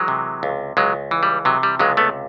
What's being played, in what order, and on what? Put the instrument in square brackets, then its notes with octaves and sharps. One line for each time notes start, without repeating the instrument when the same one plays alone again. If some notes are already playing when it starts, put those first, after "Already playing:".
Already playing: [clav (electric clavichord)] E3 F#3 G#3
C3
C#2
C#2 F#3 G#3
E3
G3
C3 F#3
G3
C#2 F#3 G#3
A3 B3